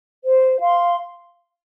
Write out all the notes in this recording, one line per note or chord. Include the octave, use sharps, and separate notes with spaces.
C5
F5 C6